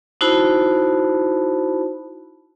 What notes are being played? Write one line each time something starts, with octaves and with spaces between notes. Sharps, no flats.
D#4 E4 F#4 C5 A5 B5